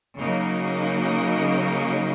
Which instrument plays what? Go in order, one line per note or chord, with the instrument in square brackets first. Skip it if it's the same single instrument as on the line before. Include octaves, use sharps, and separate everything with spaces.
[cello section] C#3 F#3 A#3 D#4